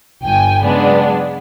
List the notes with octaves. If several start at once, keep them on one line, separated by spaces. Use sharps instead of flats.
G1 G5 G#5
C#3 F#3 G#3 B3 D4